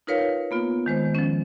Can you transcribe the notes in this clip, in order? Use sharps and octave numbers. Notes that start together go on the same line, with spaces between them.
D#4 F4 A#4 B4 C#5 F5
A#3 B3 F4
D#3 G#3 C5
F3 C#4